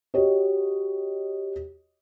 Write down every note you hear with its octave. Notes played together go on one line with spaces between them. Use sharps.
F#4 G4 C#5 D#5